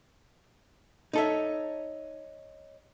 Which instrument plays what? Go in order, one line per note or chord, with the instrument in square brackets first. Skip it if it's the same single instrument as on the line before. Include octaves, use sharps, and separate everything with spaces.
[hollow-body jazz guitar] D#4 A4 E5 [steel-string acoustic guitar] C#5 D#5